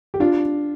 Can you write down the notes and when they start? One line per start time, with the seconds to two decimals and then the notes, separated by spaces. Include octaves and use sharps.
0.14 G4
0.20 D4 F4